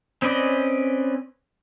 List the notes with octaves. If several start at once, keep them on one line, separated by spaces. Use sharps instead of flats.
C4 C#4 B4 D5 D#5